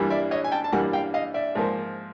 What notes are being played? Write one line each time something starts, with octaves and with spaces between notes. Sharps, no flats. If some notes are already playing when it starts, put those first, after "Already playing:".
Already playing: G2 E3 G3 A#3
D5 E5
C#5 D#5
G#5
G5 A5
A5
G2 E3 G3 A#3 F#5 G#5
F5 G5
D#5 F5
D5 E5
G#2 F3 A#3